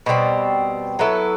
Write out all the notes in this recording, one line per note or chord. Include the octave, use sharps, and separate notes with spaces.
B2 G3 C4
F#3 B3 E4 A4